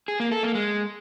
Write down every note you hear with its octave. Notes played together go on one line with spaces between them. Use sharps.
G#4
A#3
A4
A#3
G#3